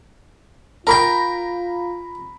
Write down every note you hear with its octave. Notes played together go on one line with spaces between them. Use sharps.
F4 A#4 G5 A#5 B5 A#6